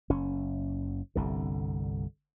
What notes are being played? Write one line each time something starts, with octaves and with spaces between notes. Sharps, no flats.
F#1 C#4
G1 C2 D3